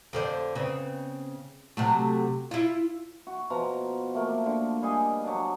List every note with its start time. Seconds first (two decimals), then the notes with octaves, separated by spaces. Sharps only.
0.13 F2 D3 C5
0.55 C#3 B3 C4
1.77 C3 F#3 A3
2.51 E4 F4
3.27 F#4
3.50 B2 F3 A#5
4.14 A3 A#3
4.46 D3
4.82 G3 G#4 D#5
5.24 F#3 D4